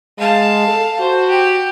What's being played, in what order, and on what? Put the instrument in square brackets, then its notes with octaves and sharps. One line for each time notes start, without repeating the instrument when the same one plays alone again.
[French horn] G#3 [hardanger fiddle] F5 A5
[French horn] A4
[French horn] F#4 [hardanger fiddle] C5
[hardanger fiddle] G4